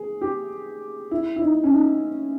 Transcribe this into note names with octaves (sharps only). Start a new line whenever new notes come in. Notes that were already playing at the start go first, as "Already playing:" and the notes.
Already playing: G#4
G4
E4
E4
D#4
C#4
D#4